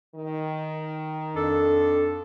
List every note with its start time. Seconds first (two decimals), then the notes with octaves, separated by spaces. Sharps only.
0.15 D#3
1.36 F2 D4 A4